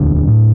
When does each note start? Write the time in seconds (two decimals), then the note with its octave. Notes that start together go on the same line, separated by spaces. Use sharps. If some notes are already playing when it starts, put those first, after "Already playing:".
Already playing: E1 D2 D3 D4
0.28 A2